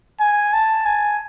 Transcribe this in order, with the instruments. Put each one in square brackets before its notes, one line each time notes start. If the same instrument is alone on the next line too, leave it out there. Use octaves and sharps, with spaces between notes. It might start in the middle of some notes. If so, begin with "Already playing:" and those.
[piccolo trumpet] G#5
A5
G#5